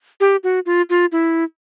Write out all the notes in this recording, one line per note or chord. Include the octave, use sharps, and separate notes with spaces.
G4
F#4
F4
F4
E4